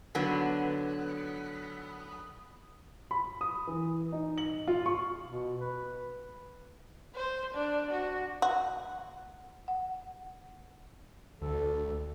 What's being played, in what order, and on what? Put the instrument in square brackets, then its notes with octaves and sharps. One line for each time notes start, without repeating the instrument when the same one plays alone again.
[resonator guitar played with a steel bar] D3 F#3 B3
[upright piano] B5
D#6
E3
D#4
F#7
F4
C#6
[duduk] B2
B4
[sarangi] C5
D4
F#4
[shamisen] F#4
[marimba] F#5
[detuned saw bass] D2 [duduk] A4